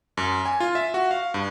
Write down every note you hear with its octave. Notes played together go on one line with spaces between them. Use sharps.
F#2
G#5
F4
E5
F#4
F5
G2